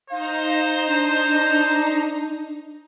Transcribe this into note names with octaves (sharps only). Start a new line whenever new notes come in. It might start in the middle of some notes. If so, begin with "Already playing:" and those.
D#4 C5 F5 A#5
D4